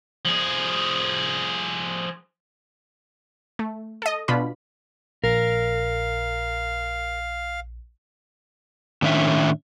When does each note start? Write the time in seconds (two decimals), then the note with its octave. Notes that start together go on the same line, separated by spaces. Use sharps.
0.25 F3 G#4
3.59 A3
4.02 A4 D#5
4.28 B2 D4 F4 B5
5.24 A#1 A#4 F5
9.02 A2 D#3 C#4 D4 E5